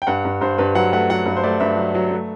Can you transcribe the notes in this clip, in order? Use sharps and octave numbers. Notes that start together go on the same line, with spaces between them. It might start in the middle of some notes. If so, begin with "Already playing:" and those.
G5
G2 F#5
G2
G2 C5
G2 B4
F#3 F#5
A3 F#5
F#3 F#5
G2
C5
A3 D5
G2 E5
F#3
F#3
A3